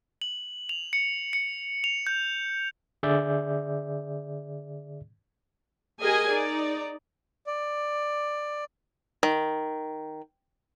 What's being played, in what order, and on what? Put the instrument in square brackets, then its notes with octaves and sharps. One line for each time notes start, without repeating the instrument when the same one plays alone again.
[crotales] F#7
F7
C#7
C#7
F7
G6
[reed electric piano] D3 G#4 D5 E5 G6
[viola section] G4 G#4 A#4 D#5 G#5
D#4 D5
[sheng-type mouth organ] D5
[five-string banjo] D#3